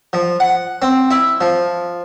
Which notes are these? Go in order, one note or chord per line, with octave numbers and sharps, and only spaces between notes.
F3
F#5
C4
E4
F3